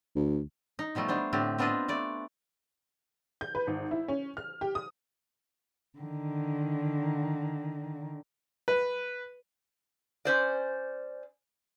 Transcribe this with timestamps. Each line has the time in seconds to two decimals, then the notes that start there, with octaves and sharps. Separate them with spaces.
0.16 D2
0.79 D#4
0.95 B2 F3 G3 A3
1.08 G3 B3 D4 C5
1.33 A2 D3 C4 G4
1.58 B3 C4 D4 F4 B4 D#5
1.88 A3 B4 D5
3.41 G6
3.55 B4
3.67 G#1
3.91 E4
4.08 C#4
4.37 F6
4.61 G4
4.75 D#6
5.99 D3 D#3
8.68 B4
10.25 C#4 C5 D5